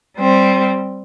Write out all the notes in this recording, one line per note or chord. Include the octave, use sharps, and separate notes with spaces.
G3 C4